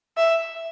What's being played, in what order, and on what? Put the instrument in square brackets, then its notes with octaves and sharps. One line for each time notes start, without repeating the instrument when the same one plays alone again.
[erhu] E5